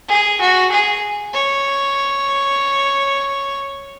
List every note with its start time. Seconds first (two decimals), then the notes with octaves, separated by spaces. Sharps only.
0.09 G#4
0.40 F#4
0.71 G#4
1.34 C#5